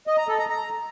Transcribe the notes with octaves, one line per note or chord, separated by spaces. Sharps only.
D#5
A#5
A4
A#5
A#5